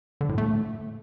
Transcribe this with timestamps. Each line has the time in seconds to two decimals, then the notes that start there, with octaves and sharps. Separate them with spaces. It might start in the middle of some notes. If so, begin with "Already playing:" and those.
0.21 D3
0.29 A2
0.38 A3